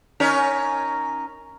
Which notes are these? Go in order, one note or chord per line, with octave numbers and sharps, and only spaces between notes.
C#4 D#4 A#4